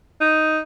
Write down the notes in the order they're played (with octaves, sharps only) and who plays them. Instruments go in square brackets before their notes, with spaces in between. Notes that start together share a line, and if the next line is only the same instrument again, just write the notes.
[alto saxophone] D#4